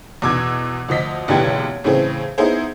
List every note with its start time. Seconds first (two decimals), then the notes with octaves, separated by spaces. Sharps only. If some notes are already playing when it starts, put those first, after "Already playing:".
0.22 E2 B2 D6 E6 G#6
0.89 D2 F3 D#5 B6
1.28 F#1 B1 D3 E3 G4 G#6
1.84 A2 C#3 E3 C4 G#4
2.38 B3 D#4 E4 G#4 C5